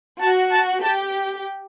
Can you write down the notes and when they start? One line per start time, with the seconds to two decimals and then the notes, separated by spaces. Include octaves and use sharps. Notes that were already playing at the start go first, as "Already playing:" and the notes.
0.20 F#4 A5
0.52 A5
0.83 G4 A5